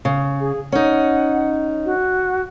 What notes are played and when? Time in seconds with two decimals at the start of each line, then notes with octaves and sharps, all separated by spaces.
0.05 C#3
0.40 G#4
0.72 C#4 D#4 F#5
1.85 F#4